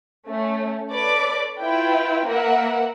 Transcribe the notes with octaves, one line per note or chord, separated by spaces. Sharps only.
A3 C#4
A4 B4 C#5 D5 D6
E4 F4 B4 G5
A#3 A#4 B4 E5 F#5